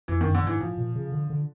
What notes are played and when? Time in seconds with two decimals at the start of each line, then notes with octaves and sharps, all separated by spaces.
0.08 F2 E3
0.21 D#3
0.26 F#2
0.35 D3
0.43 G#2 E3
0.60 A2 F3
0.78 A#2
0.96 C#3
1.12 D3
1.30 D3